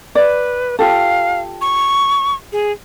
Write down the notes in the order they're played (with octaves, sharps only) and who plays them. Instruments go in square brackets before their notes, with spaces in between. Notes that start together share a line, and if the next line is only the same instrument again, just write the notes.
[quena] B4 [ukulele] D5
[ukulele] F4 G4 A4 [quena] F5
[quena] C#6
G#4